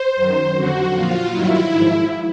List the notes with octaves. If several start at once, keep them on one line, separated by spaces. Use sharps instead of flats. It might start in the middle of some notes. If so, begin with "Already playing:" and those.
Already playing: C5
F#2 D#3 F#3
F2 D3 F#3 F#4
A#2 F3 F4
G2 D#3 F#3 E4
G#2 F3